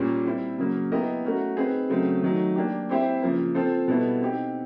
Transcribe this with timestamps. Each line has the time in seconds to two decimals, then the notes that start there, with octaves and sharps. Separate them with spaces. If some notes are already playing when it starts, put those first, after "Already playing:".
Already playing: A#2 G3 A#3 C#4
0.25 G3 C4 E4
0.58 C#3 F#3 A#3
0.92 B3 E4 G4 A#4 D#5
1.25 A3 C#4 F#4 A#4
1.57 C4 D#4 G#4 B4
1.89 C#3 F#3 A3 C4
2.23 D#3 F#3 A3
2.56 A#3 D4 G4
2.89 C4 E4 G4 C5 E5
3.22 C#3 F3 A#3
3.55 C4 F4 A4 C5
3.88 B2 G3 B3 E4 A4
4.21 C4 D#4 G4